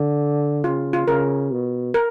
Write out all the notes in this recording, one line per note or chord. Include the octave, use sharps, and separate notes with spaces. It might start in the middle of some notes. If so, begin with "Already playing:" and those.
Already playing: D3
C#3 F4
F4
C#3 A#4
B2
A#4